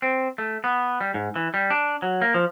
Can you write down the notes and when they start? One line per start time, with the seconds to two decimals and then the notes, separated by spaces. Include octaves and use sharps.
0.02 C4
0.38 A3
0.64 B3
1.01 G3
1.14 G#2
1.36 E3
1.54 G3
1.70 D4
2.02 F#3
2.22 A#3
2.34 F3